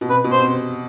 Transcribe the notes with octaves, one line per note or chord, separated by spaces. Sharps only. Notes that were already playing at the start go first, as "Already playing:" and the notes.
B2
C3 B4
B2
C5
C3